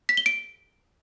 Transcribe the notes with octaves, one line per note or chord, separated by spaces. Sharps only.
B6
G7
D7